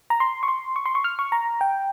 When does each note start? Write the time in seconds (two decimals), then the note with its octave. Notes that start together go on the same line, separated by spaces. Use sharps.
0.10 A#5
0.20 C6
0.43 C#6
0.48 C6
0.76 C#6
0.86 C6
0.95 C#6
1.04 F6
1.19 C#6
1.32 A#5
1.61 G5